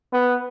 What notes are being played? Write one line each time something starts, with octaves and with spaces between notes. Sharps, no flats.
B3